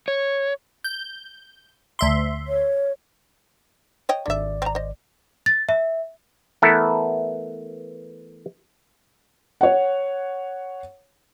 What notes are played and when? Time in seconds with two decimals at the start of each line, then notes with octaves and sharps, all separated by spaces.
0.08 C#5
0.84 G6
1.99 D2 E5 C6
2.48 C#5
4.09 C#5 D#5 G5
4.26 G#1 D3 D5 E5
4.62 C4 A#5
4.75 C5 D#5
5.46 A6
5.69 E5
6.62 E3 A3 B3 E4 A4 A#4
9.61 C#5 F#5